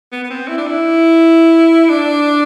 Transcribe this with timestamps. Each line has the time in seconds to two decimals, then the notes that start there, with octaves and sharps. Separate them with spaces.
0.12 B3
0.24 B3
0.30 C4
0.48 E4
0.57 D4
0.67 E4
1.89 D4